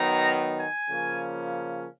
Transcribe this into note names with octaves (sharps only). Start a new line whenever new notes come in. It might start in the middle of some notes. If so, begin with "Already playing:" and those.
Already playing: D#3 F#3 B3 D#4 A#5
G#5
C#3 F3 A#3 C#4